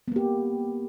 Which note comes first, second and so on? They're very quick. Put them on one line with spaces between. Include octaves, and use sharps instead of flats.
B3 A#3 G4